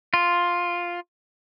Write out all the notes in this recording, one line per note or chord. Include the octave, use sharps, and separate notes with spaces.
F4